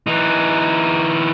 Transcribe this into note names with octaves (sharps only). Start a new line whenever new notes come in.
E3 D#4